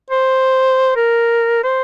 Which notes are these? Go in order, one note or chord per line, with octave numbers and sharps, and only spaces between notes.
C5
A#4
C5